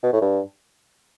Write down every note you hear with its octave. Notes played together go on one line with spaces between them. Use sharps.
B2
A2
G2